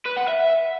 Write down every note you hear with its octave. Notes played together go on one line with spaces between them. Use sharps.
B4
F#5
E5